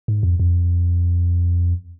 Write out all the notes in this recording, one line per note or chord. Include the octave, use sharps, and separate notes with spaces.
G#2
F2
F2